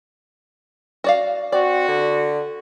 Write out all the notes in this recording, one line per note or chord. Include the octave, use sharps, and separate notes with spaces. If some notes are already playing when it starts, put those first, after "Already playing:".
F#4 D5 F5
C4 F#4 D5
D3